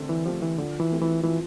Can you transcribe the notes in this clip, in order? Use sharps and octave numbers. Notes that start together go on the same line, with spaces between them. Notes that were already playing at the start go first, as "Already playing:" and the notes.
Already playing: D3 A3 C4 G4
E3
F3 A3 C4 G4
E3
D3 F3
E3
A3 C4 G4
E3
E3 F3